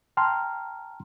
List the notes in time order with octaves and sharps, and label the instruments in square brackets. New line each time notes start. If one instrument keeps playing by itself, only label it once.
[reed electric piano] G5 A5 A#5 C6 F6